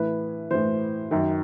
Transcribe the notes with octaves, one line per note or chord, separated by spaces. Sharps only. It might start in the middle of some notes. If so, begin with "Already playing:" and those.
Already playing: A2 E3 B4
A2 E3 C5
F#2 D#3